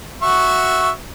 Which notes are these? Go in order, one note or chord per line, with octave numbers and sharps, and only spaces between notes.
F#4 E5 C#6